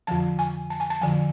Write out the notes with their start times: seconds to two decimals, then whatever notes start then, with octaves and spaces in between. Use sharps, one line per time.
0.07 F2 D3 F3 A5
0.39 G#5
0.70 A5
0.80 G#5
0.90 A5
1.01 F2 D3 F3 G#5